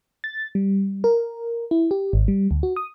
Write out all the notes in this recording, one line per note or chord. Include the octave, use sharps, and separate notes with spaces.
A6
G3
A#4
E4
G4
G#1
G3
D2
F#4
D#6